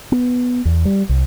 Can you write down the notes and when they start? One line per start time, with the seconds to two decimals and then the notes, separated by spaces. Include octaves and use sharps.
0.12 B3
0.65 E2
0.85 G3
1.09 C2